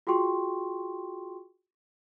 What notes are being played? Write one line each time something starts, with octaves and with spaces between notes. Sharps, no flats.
F4 F#4 G#4 G5 C6 C#6